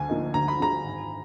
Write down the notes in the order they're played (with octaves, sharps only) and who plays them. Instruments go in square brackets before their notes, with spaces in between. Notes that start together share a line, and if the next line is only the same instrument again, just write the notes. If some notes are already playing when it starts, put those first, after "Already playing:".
Already playing: [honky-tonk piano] D2 [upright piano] G#5
[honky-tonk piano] D3 F3 A#3 D#4
[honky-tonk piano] D2 [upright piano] A#5
[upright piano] B5
[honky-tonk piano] D3 F3 G#3 [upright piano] A#5
[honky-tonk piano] G#1